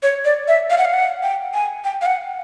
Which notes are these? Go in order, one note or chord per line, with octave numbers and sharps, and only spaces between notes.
C#5
D5
E5
F5
F#5
F5
F#5
G5
G#5
G5
F5
F#5